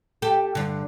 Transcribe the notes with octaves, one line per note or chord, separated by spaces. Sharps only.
G4 A4
G2 D3